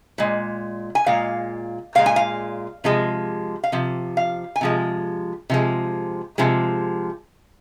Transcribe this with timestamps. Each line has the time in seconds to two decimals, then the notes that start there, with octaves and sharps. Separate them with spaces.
0.18 A#2 G#3
0.95 G#5
1.06 A#2 G#3 F5
1.95 A#2 G#3 F5
2.06 G#5
2.16 F5
2.84 C3 F3 G#3
3.64 F5
3.72 C3 F3
4.17 F5
4.56 G#5
4.61 C3 F3 G#3
5.50 C3 F3 G#3
6.38 C3 F3 G#3